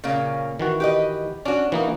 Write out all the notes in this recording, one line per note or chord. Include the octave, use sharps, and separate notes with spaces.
A#2 C#3 A#3
D#3 E3 F#4
G4 B4 D#5
C#4 D4 F#4
E3 A#3 D#4 F#4